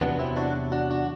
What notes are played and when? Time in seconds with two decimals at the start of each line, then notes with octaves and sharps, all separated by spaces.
0.01 E2 C3 F#3 B3 D4
0.19 C4 E4
0.36 D4 F#4
0.72 D4 F#4
0.91 D4 F#4